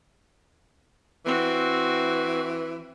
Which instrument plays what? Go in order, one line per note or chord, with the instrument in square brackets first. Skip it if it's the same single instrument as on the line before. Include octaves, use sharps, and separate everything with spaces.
[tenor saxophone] E3 [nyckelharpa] C4 F#4